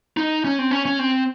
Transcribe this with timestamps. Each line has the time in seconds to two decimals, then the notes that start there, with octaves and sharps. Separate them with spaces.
0.17 D#4
0.45 C#4
0.59 C4
0.71 C#4
0.86 C#4
0.99 C4